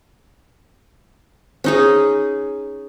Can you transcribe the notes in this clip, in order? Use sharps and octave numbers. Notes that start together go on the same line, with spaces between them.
C#4 D#4 G#4